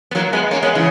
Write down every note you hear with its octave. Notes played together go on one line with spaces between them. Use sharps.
B3
F#3 A#3
G#3 B3
A#3 C#4
G#3 B3
C#3 E3